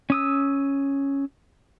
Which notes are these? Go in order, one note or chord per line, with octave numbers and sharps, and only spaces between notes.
C#4 D#6 E6